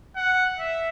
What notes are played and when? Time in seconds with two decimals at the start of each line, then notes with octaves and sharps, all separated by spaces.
0.16 F#5
0.59 E5